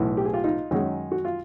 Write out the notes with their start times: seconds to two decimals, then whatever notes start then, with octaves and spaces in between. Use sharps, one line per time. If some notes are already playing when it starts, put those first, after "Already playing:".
Already playing: B1 A2 E3
0.17 G4
0.25 G#4
0.33 F4 G4
0.44 D#4 F4
0.71 F#2 D#3 G#3 C#4 D#4
1.12 F#4
1.25 F4